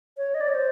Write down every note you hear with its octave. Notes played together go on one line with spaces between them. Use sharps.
C#5
D#5
D5
C#5
C5